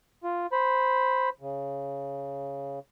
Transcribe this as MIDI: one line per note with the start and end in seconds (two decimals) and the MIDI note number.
0.24 0.47 65
0.52 1.29 72
0.52 1.29 83
1.41 2.79 49